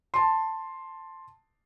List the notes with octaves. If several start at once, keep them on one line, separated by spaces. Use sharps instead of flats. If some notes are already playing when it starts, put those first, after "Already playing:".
A5 C6